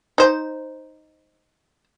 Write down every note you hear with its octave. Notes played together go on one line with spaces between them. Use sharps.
D#4 C5